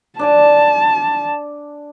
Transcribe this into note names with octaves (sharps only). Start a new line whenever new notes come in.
D4 D5 G#5 A5